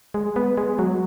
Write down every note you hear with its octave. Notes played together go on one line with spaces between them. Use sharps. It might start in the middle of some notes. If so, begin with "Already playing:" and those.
G#3
B3
G#3
F#3